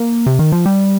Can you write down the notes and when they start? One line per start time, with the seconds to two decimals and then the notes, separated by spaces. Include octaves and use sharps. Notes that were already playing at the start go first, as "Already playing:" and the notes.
Already playing: A#3
0.26 C3
0.39 D#3
0.52 F3
0.66 G3